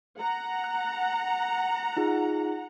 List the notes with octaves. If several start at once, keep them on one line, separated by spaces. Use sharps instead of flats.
F#5 A#5
F#6
D#4 F4 G#4